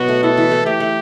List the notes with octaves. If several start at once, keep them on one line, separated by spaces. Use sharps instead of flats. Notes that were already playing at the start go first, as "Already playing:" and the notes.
Already playing: B2 F#3 F#4 B4
A3
E4 A4
E3
A3
A3 G4
A3